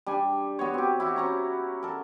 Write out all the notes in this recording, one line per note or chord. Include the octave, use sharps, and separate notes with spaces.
G3 D4 G#5
B3 F#4 C#5
C4 G4
E4 F#4 G4
C#4 A#5 C#6
A4 A#4